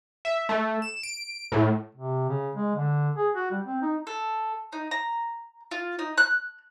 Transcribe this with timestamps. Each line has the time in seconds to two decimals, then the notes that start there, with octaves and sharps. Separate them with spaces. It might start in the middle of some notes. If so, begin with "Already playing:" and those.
0.25 E5
0.49 A3
0.82 E7
1.03 D7
1.52 A2
1.95 C3
2.29 C#3
2.55 G#3
2.75 D3
3.16 G#4
3.35 F#4
3.51 G3
3.65 C4
3.82 D#4
4.07 A4
4.73 D#4
4.91 A#5
5.71 F4
5.99 D#4
6.18 F#6